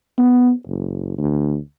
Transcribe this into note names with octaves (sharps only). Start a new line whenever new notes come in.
B3
F#1
D2